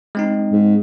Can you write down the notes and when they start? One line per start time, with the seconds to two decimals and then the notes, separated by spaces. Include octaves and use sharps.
0.15 G#3 C4 D#4
0.52 G#2